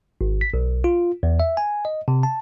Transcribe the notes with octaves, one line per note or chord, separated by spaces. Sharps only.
G#1
B6
B1
F4
E2
E5
G#5
D#5
C3
A5